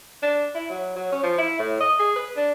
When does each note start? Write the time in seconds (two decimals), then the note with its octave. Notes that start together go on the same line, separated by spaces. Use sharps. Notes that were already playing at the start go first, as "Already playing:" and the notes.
0.23 D4
0.55 E4
0.70 F#3
0.96 F#3
1.12 C#4
1.23 F3
1.38 E4
1.59 A2
1.80 D#5
1.99 G#4
2.16 B4
2.36 D4